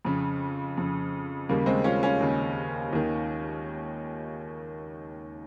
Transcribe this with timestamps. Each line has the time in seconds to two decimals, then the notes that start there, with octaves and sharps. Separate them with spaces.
0.05 F2 C#3
0.77 F2 C#3
1.49 D#2 C#3 G3 A#3
1.66 G#3 C4
1.84 C#4 F4
2.03 C#4 F4
2.21 D#2 C#3
2.93 D#2 D#3